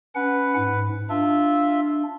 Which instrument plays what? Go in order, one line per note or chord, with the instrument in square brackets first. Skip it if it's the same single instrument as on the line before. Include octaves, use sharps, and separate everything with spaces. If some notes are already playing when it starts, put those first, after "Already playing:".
[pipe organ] C#4 F#5 [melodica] B4
[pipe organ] G#2
[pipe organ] D4 [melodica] F4 E5